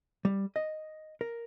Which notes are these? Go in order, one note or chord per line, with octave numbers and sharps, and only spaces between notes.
G3
D#5
A#4